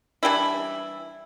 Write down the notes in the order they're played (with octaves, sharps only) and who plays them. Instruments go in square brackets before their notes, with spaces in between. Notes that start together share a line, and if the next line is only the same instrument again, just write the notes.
[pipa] E3 G3 D4 E4